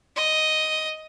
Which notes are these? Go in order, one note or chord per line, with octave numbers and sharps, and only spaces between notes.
D#5